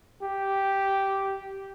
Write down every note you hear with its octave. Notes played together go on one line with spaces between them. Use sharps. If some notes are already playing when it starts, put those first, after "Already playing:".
G4